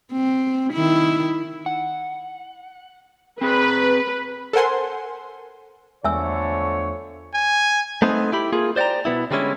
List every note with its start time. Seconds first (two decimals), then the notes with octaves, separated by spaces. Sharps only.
0.13 C4
0.73 D#3 E4
1.66 F#5
3.41 C4 G#4 B4
4.53 A4 A#4 C5 F#5 G#5 C6
6.04 E2 D3 F3 A3 C#5 E5 G#5 E6
7.34 G#5
8.02 A3 B3 C4 D#4
8.32 E4 G4 B5
8.53 A#3 F4 G#4
8.76 C5 D5 F#5 G5 A#5
9.05 B2 F3 B3 E4
9.31 D3 G3 G#3 C#4 E4